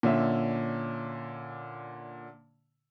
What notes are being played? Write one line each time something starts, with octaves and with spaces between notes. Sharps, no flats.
A#2 D3 C#4 E5